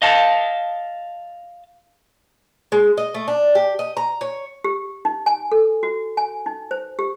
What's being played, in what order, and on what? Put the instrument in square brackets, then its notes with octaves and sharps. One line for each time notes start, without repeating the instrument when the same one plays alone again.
[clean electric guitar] D#5 F5 A5
[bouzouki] G#3
D#5
A3
D4
G4
D#5
A#5
C#5
[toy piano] G4
D#4
G#5
A4
F#4
G#5
D#4
C5
G4